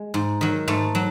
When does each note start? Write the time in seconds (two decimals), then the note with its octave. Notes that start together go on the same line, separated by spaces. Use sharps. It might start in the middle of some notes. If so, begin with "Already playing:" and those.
Already playing: G#3
0.14 G#2
0.41 D#3 F#3
0.68 G#2 A3
0.95 F#3